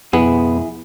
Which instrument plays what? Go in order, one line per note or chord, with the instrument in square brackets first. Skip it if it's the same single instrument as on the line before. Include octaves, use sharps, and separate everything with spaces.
[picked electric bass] F2 B2 [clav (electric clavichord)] B3 [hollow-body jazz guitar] E4 G#4